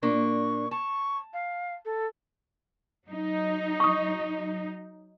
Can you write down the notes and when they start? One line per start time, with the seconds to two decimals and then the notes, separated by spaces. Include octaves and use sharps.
0.03 A#2 A#3 D4 C#6
0.71 A5 C#6
1.33 F5
1.85 A4
3.07 F#3 D#4
3.80 C#6 D#6